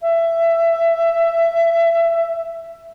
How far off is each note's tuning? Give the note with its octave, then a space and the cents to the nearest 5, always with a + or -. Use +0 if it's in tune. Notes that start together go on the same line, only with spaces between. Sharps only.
E5 +15